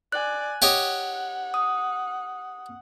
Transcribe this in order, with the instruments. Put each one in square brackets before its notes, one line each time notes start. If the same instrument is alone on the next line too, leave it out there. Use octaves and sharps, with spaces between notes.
[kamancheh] D5 G#5 [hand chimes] F#6
[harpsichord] G4 C#5 D#5 [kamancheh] F#5
[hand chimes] D#6